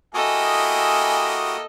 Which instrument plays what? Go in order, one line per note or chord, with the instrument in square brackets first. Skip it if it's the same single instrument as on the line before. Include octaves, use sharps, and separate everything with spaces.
[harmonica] A#3 E4 G4 [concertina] F#4 D#6 [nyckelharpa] A4 D#5 [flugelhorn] G#5